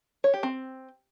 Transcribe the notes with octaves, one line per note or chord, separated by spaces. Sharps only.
C#5
G4
C4